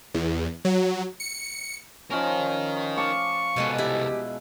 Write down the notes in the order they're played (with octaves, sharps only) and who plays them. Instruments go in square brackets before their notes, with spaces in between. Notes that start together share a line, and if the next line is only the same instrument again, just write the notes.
[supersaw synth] E2
F#3
C#7
[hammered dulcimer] F3 C#4 [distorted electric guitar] A#4 D#5
[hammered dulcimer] D5 F5 A5 [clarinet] C#6
[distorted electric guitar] C2 A4 [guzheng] B2 G#3 B3
[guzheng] E4 [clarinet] G4